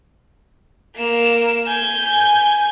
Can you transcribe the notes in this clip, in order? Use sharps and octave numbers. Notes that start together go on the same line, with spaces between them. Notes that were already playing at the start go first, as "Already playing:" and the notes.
A#3 E7
G#5 G6